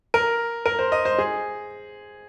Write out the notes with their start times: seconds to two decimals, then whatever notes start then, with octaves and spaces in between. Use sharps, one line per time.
0.14 A#4
0.66 A#4
0.79 C5
0.92 D#5
1.05 C5
1.19 G#4